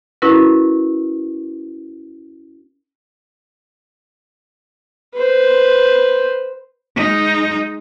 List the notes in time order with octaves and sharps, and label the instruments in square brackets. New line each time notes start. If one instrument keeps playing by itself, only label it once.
[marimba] C#4 E4 F#4 A#4 B4
[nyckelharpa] B4 C5
[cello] G#3 D#4